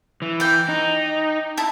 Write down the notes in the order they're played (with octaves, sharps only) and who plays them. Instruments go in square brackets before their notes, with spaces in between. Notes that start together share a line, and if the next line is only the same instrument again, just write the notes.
[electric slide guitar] E3
[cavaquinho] D5 G5
[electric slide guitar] D#4
[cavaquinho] E4 A5